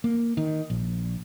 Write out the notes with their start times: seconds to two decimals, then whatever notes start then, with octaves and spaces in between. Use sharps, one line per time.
0.04 A#3
0.37 D#3
0.70 A#1